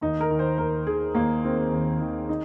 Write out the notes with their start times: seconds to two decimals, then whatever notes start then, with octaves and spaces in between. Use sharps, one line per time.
0.01 D#2 D#4
0.20 A#4
0.30 D#3
0.39 C5
0.58 D#2 A#4
0.86 D#3 G#4
1.15 D#2 A#3
1.44 D#3 C4
1.72 D#2
2.01 D#3
2.29 D#4